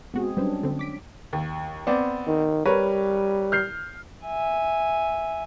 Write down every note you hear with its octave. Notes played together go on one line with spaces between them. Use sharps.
G#3 B3 C4 F#4 G#4
F#3 G3 C#4 D4 B4 C5
D3 C4
D6 B6 D7
D#2
B3 C4 D5
D#3
G3 A#4 B4 C#5
F6 G6 C7
E5 G#5